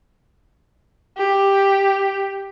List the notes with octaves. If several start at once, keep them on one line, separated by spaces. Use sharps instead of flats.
G4